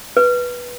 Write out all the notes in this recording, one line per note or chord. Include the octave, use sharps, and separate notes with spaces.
B4